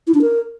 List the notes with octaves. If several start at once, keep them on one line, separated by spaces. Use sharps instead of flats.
E4
D4
A#4